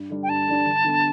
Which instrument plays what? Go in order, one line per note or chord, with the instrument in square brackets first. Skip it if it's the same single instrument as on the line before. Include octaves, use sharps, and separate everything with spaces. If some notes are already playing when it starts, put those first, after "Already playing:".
Already playing: [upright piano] G2
D3 G3 D4
[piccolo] G5
[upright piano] G2 [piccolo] A5
[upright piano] D3 G3 D4
G1
G2 D3 B3